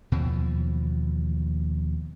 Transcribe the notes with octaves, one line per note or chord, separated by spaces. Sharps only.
D#2 B2 E3 F3